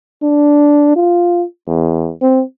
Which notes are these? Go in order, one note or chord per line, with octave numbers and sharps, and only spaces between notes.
D4
F4
E2
C4